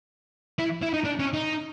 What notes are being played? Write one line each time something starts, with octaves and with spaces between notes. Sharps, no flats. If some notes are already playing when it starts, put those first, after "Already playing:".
E4
E4
D#4
D4
C#4
D#4